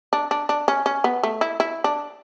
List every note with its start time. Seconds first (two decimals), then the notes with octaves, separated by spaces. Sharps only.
0.13 D4
0.31 D4
0.49 D4
0.68 C#4
0.86 C#4
1.04 B3
1.23 A3
1.41 E4
1.60 E4
1.84 D4